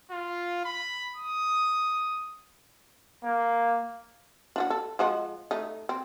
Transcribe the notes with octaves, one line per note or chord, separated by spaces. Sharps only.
F4
B5
D#6
A#3
D4 F4 F#4
A4
F3 G#3 F#4
A3 D#4
C4